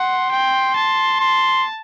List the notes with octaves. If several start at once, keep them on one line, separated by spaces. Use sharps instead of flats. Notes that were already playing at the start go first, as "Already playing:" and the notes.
Already playing: F#5 C6
G5
A5
C6